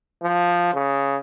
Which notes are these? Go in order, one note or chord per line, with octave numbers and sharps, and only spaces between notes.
F3
C#3